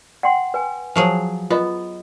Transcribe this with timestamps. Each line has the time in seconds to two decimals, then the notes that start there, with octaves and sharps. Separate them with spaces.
0.23 F#5 G5 C6
0.54 B4 G#5
0.96 F3 F#3 G#4
1.50 B3 F4 D#5 A#5